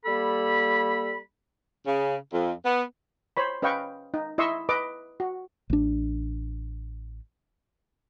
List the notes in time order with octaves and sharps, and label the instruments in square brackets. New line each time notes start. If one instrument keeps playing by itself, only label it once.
[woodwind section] G3 A#3 A4 B5
[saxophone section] C#3
F2
B3
[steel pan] C5 C#5 B5
C#4 B4 D#5 F5 G5 C#6
D#4
E4 D#5 E5 C6 C#6 E6
B4 D#5 D6
F#4
[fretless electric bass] A1 D4